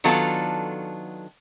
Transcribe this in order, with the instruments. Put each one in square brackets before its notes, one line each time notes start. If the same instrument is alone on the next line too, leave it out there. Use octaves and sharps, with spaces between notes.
[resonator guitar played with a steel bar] D#3 F#3 B3 D4 F4 A4